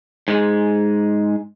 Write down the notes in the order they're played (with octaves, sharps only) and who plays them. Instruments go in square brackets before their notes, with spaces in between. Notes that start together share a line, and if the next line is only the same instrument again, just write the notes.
[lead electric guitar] G#2 G#3